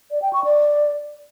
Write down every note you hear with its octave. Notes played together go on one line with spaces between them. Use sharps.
D5
G5
C#6
D5